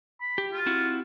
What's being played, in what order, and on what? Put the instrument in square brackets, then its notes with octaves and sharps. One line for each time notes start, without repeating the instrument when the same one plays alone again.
[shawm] B5
[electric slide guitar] G4
[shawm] F4
[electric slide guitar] C4 E4 F#4